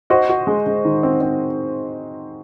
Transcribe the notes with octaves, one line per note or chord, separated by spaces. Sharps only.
F#4 C5 D#5
F#4
G#3
G#3
D#3
C4
C4